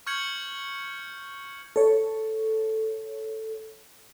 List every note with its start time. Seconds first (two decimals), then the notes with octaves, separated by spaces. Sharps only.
0.06 C#6 F6 G6 G#6 C#7 F#7
1.76 A4 C#5